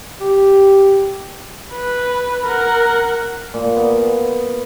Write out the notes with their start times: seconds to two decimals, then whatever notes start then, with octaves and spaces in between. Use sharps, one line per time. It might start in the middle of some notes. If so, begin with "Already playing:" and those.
0.21 G4
1.75 B4
2.47 A#4 F#5
3.54 A#2
3.76 B3